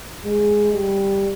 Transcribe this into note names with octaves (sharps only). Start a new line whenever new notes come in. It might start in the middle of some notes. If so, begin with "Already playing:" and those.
G#3
G3